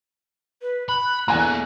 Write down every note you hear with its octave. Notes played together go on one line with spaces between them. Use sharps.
B4
B5 F#6
E2 A#3 A4 G#5 A#5